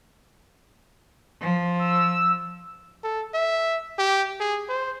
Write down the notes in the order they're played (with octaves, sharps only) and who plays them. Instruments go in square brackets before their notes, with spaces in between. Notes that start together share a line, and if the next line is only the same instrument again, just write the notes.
[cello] F3
[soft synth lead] E6
[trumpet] A4
E5
G4
G#4
C5